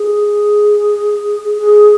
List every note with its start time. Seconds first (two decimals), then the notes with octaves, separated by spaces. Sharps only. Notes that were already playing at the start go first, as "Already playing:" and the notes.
Already playing: G#4
1.57 G#4